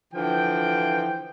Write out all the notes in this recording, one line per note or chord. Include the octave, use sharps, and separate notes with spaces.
D3 E3 F3 G5